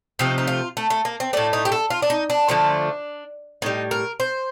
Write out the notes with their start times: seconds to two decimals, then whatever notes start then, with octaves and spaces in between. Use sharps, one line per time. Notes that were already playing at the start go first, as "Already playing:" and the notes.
0.19 C3 F3 A3 D#4
0.38 D#4
0.47 F4
0.77 A3
0.90 A3
1.05 A#3
1.20 C4
1.33 A2 A3 D4
1.53 D#4
1.65 G4
1.72 A4
1.90 F4
2.02 D4
2.10 D#4
2.30 D4
2.49 D3 F3 A3
3.62 A2 G3 D#4
3.91 A#4
4.20 C5